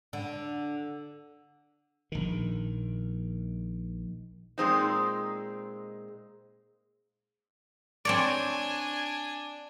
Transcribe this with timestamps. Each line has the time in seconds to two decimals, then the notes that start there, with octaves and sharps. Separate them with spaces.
0.13 D3
2.12 A#1 D#3
4.58 A#2 G#3 C4 D#4
8.05 C4 D4 C#5 D5 G#5